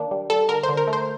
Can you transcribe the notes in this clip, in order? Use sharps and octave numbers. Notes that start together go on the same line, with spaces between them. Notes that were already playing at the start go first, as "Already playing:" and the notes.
Already playing: D#3 A#3 D4
G3
G3 A4
D3 A#4
C5
D3
A#4
A3
C5